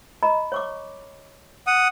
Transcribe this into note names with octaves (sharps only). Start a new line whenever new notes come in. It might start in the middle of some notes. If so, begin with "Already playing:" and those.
D#5 A#5 B5
C#5 C#6 D6
F#5 D#6